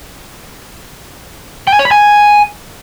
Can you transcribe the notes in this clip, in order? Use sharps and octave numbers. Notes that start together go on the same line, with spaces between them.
G5
G#5
C#5
B5
G#5